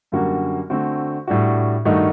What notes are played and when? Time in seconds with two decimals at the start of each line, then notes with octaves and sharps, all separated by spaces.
0.12 F#2 D3 G3 A#3 F#4
0.70 D3 A3 C4 F#4
1.28 A2 G3 D4 F#4
1.85 G2 D#3 A3 D#4 F#4